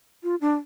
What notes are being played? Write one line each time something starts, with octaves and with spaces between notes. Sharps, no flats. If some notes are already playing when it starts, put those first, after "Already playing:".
F4
D4